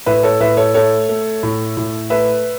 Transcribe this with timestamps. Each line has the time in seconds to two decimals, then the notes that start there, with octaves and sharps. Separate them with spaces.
0.06 A2 B4 E5
0.23 A4 C#5
0.40 A2 B4 E5
0.57 A4 C#5
0.74 A3 A4 C#5
1.09 A3
1.43 A2
1.77 A2
2.10 A3 B4 E5